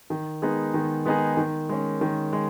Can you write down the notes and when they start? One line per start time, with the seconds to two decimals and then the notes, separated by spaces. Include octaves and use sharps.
0.10 D#3
0.42 G#3 B3 D#4 G#4
0.74 D#3
1.06 G#3 B3 D#4 G#4
1.37 D#3
1.69 G#3 C#4
2.01 D#3
2.33 G#3